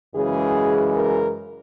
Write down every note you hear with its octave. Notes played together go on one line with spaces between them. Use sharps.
F#2 C#3 E3 G#3 G#4
A#4